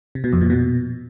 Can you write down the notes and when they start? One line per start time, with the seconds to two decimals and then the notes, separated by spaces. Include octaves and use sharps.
0.15 C3
0.24 B2
0.33 F2
0.41 A#2
0.50 B2